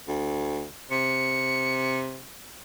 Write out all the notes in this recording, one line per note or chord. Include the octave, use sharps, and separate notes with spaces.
D2
C3 C#7